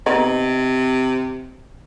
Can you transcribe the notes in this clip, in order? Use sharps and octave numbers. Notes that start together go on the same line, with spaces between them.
C3 B3 D#4